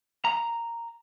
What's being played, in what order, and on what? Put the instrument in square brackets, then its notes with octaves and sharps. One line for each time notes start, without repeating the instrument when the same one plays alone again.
[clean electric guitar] A#5